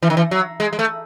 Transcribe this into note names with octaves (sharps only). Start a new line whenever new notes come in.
E3
D#3
E3
F#3
G#3
G#3
A3